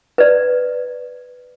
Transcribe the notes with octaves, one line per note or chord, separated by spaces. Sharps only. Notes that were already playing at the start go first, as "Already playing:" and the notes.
B4 D5